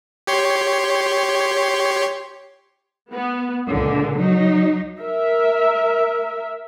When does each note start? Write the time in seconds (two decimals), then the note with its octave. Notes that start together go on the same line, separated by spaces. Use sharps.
0.27 G4 C#5 C6
3.12 B3
3.69 C#2 A#2 D3
4.18 F#3 D#4
5.01 A#4 E5